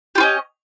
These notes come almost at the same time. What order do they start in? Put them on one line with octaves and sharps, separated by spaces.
G4 F4 C#4 D#5